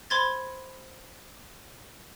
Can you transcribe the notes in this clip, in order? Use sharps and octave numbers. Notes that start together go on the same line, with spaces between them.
C5 B5 C6 G#6 A6